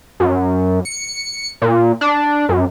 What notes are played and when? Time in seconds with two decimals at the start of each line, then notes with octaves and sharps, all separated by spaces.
0.20 F#2
0.85 C#7
1.62 A#2
2.01 D4
2.49 F#2